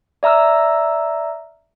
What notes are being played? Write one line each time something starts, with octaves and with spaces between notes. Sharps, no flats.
D5 E5 A#5 E6 F6